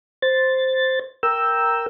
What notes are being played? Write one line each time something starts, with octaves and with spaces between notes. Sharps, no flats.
C5 A6
A#4 G5 E6